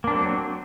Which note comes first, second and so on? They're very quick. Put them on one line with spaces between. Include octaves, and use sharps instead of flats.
A#3 D4 C4 F#3